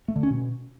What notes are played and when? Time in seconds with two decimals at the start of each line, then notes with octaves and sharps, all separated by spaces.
0.08 A3
0.16 D3
0.23 C#4
0.31 B2